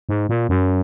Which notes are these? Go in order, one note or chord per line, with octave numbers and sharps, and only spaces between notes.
G#2
A#2
F#2